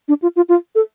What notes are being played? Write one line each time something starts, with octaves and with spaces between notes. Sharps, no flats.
D4
F4
F4
F4
A4